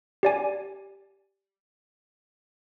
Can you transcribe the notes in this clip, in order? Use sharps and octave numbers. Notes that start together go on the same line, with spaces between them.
G4 D5 G#5